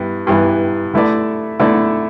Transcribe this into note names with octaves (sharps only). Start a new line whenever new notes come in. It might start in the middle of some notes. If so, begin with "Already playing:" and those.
Already playing: G2 E3 B3
G2 E3 B3
D3 A3 E4 B4 D5
D3 A3 E4 B4 D5